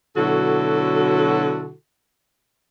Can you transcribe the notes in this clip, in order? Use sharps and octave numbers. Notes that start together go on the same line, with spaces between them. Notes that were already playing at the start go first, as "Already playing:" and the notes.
B2 D3 F#3 E4 F#4 A4